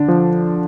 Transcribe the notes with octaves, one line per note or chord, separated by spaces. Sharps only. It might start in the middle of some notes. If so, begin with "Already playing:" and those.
Already playing: D3 D4
F3